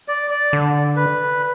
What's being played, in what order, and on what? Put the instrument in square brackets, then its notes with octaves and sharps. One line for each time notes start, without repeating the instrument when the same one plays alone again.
[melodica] D5
D5
[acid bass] D3
[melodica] B4